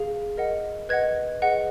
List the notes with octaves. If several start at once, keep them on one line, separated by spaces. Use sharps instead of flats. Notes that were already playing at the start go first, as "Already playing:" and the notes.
Already playing: G#4 F5
A#4 D#5 F#5
B4 D#5 F#5 G#6
G#4 B4 D#5 F#5